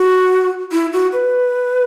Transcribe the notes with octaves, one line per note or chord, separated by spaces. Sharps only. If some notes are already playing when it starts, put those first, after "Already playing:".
Already playing: F#4
E4
F#4
B4